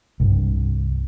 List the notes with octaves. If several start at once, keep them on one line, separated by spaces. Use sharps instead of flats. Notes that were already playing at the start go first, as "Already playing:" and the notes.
C2 G2